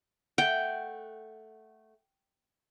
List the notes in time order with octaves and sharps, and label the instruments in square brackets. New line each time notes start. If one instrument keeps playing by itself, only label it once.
[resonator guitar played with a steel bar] A3 F#5 [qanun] G5